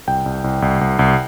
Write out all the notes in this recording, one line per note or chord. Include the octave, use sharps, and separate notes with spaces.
C2 G5
C2
C2
C2
C2
C2